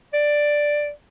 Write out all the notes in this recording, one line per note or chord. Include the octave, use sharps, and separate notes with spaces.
D5